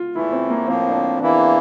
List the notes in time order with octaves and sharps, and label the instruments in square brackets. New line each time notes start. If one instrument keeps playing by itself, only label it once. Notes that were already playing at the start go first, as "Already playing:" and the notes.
Already playing: [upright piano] F4
[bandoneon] E2 E3 A3 [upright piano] E4
[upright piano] C4
A#3
[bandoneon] A2 F3 A#3 [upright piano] C4
[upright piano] D4
C4
[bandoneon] E2 E3 A#3 E4 [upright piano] D4